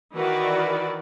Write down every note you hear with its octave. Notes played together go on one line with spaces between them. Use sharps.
D#3 E3 F#4 B4 D5